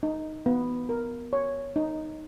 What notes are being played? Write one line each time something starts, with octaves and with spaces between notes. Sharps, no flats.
D#4
B3
A#4
C#5
D#4